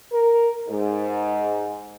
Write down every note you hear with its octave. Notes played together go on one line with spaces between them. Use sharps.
A#4
G#2